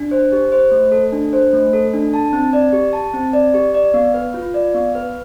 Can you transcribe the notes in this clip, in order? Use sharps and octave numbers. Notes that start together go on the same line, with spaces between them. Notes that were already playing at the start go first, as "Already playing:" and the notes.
Already playing: D4
C5
G4
C5
A3
A4
D4
C5
A3
A4
D4
A5
C4
D5
G4
A5
C4
D5
G4
D5
B3
B4
F4
D5
B3
B4